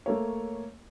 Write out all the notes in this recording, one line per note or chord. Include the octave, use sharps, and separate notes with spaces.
A3 A#3 C#5